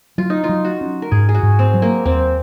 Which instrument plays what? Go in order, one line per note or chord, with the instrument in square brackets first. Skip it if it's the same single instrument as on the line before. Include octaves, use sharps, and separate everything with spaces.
[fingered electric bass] F#3 [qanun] F4
[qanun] D#4
F4
[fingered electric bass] F#3
[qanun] F#4
[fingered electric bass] C#4
[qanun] A#4
[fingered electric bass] G#2 [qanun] G#4
[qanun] G#4
F#4
[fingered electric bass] G#2
[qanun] C4
[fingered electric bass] F#3
[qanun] A#3
[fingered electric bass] D#2 [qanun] C4